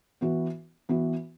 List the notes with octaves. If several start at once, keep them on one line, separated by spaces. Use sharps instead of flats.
E3 B3 F#4
E3 B3 F#4